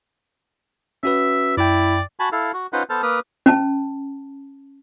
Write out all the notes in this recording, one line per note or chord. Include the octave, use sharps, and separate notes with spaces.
C#4 F#4 B4 E5
F#2 E4 D5 G5
F#4 G#5 A5 B5
E4 A4 F5
F#4
C#4 D#4 F4 B4 C5 F#5
B3 A4 C5 A5 F6
A#3 B4 D#6 F6
C#4 A5